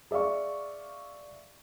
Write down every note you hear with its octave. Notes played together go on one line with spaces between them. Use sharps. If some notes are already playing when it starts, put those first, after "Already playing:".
G#4 D5 E5 F5 C#6